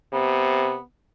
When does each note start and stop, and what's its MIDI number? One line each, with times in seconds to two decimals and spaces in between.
0.13 0.76 48
0.13 0.82 59